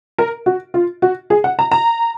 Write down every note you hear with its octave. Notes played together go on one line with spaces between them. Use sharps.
A#4
F#4
F4
F#4
G#4
F#5
A#5
A#5